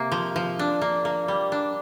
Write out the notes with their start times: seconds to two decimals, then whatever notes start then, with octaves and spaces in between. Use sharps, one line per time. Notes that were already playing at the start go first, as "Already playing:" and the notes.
Already playing: C3 A#3
0.12 F3
0.36 F3
0.59 D4
0.81 A#3
1.05 A#3
1.28 G3
1.52 D4